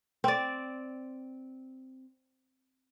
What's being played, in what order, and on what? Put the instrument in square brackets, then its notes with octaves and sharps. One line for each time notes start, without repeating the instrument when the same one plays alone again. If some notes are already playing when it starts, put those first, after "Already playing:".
[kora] C4 D5